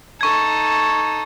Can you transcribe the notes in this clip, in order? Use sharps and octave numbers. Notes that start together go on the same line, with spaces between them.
D#4 A4 C#6 G#6